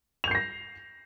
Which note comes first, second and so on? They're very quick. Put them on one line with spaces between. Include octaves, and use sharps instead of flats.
F7 G6 C7 A#6